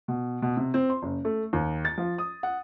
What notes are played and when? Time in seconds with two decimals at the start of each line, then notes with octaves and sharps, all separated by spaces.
0.08 B2
0.42 B2
0.57 C3
0.74 C4
0.90 C6
1.02 F#1
1.25 A3
1.53 D#2
1.85 A6
1.98 F3
2.18 D#6
2.43 F#5